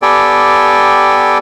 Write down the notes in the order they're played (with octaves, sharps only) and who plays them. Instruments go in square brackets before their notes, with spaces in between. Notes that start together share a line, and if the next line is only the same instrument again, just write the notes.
[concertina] B3 G4 A4 D5 G5 G#5